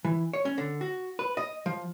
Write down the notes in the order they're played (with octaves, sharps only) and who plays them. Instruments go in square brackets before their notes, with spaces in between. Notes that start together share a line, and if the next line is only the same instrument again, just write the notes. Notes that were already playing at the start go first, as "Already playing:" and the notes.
[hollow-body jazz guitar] E3
C#5
C#4
D3
F#4
B4
D#5
F3